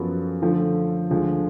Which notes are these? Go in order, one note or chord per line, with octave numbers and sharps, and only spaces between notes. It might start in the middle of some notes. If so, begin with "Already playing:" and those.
Already playing: F#2 F3 B3 F#4 A4
D3 F3 A3
D2 D3 F3 G#3